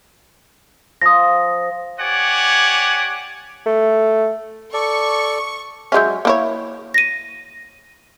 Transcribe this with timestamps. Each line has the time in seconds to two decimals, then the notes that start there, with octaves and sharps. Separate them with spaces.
1.02 F3 D#6 A#6
2.00 G4 C#5 D5 F#5 G#5
3.66 A3
4.74 A4 D5 C#6
5.92 F#3 G#3 C#4 E5 G6
6.25 A#3 E4 C#5
6.94 A#6 D#7